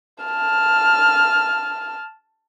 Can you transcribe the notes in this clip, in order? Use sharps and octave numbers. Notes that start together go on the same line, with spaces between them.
A5 F6